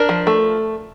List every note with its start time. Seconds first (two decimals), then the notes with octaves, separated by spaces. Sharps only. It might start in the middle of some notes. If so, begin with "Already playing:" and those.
Already playing: D4 A#4
0.09 F3
0.27 A3